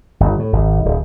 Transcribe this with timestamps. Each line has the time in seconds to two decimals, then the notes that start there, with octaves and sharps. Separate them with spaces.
0.20 G1
0.39 A2
0.53 G#1
0.85 D1